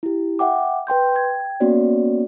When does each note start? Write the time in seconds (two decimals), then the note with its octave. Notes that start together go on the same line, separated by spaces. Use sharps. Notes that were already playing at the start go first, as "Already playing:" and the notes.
0.03 E4 G4
0.39 E5 F#5 G5 D6
0.87 B4 G5 C6 G6
1.16 G5 G#6
1.60 A#3 B3 C#4 F#4 C#5 D5